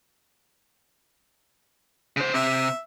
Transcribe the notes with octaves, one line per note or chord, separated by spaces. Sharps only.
C#3 C5
C3 E5